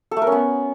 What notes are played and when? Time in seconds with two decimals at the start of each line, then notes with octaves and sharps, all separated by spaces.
0.11 A4
0.17 A3
0.22 A#4
0.27 C#4
0.32 B3